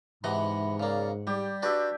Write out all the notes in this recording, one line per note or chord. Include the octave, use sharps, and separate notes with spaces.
G#2 C3 E3 D#5 F#5 B5
C#3 A#3 D5
G3 G4 D5
D4 F#4 G4 B4 E5